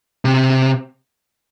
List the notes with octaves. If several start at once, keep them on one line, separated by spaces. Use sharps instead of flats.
C3